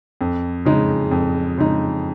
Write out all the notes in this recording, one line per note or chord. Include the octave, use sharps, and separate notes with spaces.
F2
C#3 G#3 D#4
F2
C#3 G#3 D#4